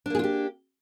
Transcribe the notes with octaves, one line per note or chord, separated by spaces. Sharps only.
A#3 D4 F4 G4 G#4